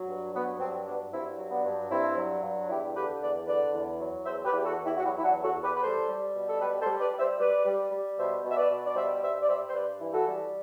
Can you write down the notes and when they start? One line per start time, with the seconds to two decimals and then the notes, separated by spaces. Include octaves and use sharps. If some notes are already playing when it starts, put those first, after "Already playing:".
Already playing: F#3
0.08 G2
0.33 F#3 B3
0.60 G2 C4
0.86 F#3 B3 D4
1.12 G2 C4 E4
1.38 F#3
1.51 B3 D4
1.65 G2
1.91 G2 C4 E4
2.16 F#3
2.43 G2
2.69 E2 E4 G4
2.95 D3 G4 B4
3.21 E2 B4 D5
3.47 D3 B4 D5
3.74 E2
3.99 F#3
4.25 E2 C5 E5
4.45 G4 B4
4.52 E2
4.57 G4
4.65 F#4 A4
4.78 E2
4.84 E4 G4
4.97 F#4
5.03 F#3 E4 G4
5.18 E4
5.24 D4 F#4
5.31 E2
5.43 F#4 A4
5.57 E2
5.63 G4 B4
5.74 B4
5.82 G3 A4 C5
6.09 G3
6.35 B2
6.49 A4
6.61 G3 G4 B4
6.80 A4 C5
6.86 G3
6.99 B4 D5
7.13 G3
7.19 C5 E5
7.39 G3 B4 D5
7.65 G3
7.92 G3
8.18 B2 C5 E5
8.44 B2
8.51 E5
8.56 B4 D5
8.69 B2
8.85 D5
8.95 G3 C5 E5
9.22 G2 C5 E5
9.41 D5
9.49 G3 C5 E5
9.68 C5
9.74 G2 B4 D5
10.01 E3
10.13 F#4 A4
10.27 G3